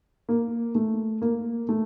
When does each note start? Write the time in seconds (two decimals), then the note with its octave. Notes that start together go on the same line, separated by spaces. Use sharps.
0.29 A#3
0.75 A3
1.22 A#3
1.69 A3